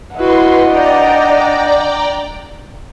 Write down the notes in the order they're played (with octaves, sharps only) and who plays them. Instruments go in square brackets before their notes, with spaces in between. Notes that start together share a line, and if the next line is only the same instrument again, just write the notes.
[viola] E4 F#4 [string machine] B4 C6 [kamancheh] D#5 F#5
[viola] D4 [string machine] D5 G5 A#5